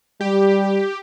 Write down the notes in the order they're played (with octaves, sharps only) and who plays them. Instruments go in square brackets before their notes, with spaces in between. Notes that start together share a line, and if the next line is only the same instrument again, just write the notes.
[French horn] G3 [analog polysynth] G4